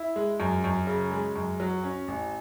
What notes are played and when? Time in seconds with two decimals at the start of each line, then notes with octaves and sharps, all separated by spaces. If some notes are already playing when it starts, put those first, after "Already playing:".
Already playing: E4
0.16 G#3
0.40 F#2
0.64 F#2
0.87 C#3
1.12 G#3
1.36 F#2
1.60 F#3
1.84 C#4
2.08 A1